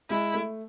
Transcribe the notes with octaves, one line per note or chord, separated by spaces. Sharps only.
G#3 E4
A3